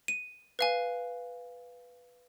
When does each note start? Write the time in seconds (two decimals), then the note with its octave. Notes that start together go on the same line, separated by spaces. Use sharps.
0.08 D#7
0.59 B4 F5 G#5